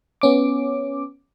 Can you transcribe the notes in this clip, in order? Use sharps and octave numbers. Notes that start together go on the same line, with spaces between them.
B3 C#4 D6